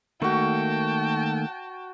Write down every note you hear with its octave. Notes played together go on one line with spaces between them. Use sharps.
D#3 A3 A#3 F#4 G5 A5 C#6